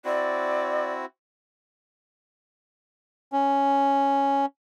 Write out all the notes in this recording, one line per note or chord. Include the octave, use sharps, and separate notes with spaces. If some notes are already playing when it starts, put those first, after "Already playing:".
C4 E4 F#4 D5
C#4